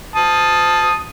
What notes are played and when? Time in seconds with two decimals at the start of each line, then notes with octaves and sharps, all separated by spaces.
0.16 A5 D#6